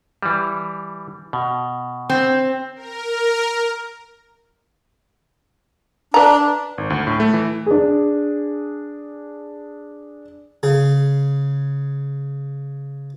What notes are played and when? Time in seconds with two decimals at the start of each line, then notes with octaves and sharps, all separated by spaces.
0.23 E3 G3
1.33 B2
2.10 C4
2.76 A#4
6.14 D4 B4 A#5
6.78 G#1
6.90 D2
7.07 A2
7.20 A3
7.34 E3
7.66 D4 G#4
10.63 C#3 G#4